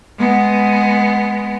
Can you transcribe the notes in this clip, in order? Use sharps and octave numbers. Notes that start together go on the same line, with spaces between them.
G#3 B3